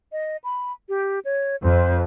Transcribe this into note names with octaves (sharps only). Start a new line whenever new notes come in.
D#5
B5
G4
C#5
F2 C5